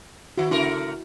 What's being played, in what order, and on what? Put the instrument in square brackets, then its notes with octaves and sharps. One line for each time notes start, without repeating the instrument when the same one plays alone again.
[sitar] D#3 E4 [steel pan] F#4
[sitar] C#3 A3 A#4 [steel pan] E4